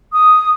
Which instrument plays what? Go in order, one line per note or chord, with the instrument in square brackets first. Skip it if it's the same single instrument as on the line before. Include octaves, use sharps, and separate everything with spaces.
[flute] D#6